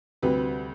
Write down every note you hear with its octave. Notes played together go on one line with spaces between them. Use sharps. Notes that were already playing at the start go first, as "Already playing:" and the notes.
D2 C3 G3 C4 B4